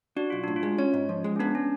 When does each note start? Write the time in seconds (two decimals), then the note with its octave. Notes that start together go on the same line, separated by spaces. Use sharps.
0.16 D4 F#4
0.30 B1 F4
0.44 A2 D4
0.56 F4
0.63 G#3
0.78 C#4 C#5
0.94 G#2
1.09 F3
1.24 G#3
1.36 C#4
1.40 B3 D4
1.55 C#4